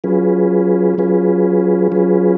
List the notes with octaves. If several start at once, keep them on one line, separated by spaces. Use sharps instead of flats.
F#3 C#4 F4 G#4 B4
F#3 C#4 F4 G#4 B4
F#3 C#4 F4 G#4 B4